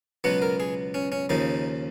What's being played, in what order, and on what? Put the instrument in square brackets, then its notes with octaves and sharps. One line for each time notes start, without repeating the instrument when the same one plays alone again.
[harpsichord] C#2 B2 F#3 B3 F#5
A#4
G#4
C#4
C#4
D#2 C#3 F3 D#4